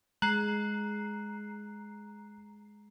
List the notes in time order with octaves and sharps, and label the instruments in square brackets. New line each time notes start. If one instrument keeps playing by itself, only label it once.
[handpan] G#3 [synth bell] A#5 C7 [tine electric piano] F#6